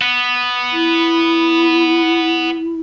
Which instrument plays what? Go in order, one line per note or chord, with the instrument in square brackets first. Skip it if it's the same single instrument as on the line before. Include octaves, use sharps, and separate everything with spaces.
[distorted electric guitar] B3
[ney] E4